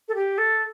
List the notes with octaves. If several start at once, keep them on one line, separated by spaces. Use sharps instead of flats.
A4
G4
A4